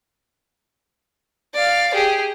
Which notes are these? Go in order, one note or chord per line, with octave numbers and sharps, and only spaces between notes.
D5 F5
G4 G#4